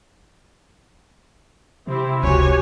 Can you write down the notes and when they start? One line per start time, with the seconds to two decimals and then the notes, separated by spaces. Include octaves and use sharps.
1.87 C3 C4 E4 G4
2.23 F1 C#2 F#4 G4 C#5 G#5